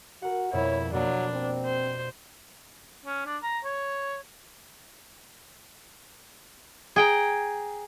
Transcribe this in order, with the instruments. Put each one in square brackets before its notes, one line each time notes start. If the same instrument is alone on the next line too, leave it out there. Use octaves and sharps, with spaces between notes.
[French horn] F#4 [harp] A#4 F#5
[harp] F2 B2 G3 [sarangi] E4 [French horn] C#5
[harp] B2 A#3 [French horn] F#3 [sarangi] D4
[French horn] C4
[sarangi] C5
[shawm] C#4
D4
A#5
C#5
[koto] G#4 G5 A#5